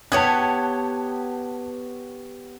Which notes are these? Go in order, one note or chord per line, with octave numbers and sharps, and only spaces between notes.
B3 G4 C#5 A5 F#6 G#6